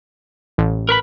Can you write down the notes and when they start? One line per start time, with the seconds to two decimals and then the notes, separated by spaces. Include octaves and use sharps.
0.58 A1
0.89 A#4 B4 B5